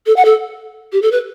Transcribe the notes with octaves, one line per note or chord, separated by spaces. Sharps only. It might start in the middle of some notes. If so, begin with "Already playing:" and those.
A4
F#5
A4
G4
A4
B4